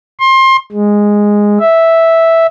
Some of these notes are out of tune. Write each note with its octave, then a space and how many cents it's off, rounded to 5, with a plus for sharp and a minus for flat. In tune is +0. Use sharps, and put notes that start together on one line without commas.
C6 +25
G#3 -5
E5 -5